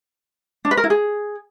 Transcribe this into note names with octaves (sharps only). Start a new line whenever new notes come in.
D4
B4
A#4
E4
G#4